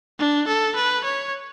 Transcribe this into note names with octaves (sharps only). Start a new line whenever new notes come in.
D4
A4
B4
C#5